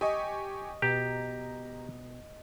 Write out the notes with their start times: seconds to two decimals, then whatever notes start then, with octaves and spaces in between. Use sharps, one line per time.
0.01 G4 D#5 G#5 C#6
0.82 B2 G4 A#5